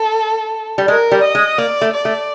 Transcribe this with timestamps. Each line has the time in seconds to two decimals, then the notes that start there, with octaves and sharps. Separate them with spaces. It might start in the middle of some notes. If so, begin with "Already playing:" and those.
Already playing: A4
0.78 G3
0.88 G#3 A#4
1.12 G3
1.23 D#5
1.35 G#3
1.58 A#3 D5
1.81 A3
1.93 D5
2.05 A3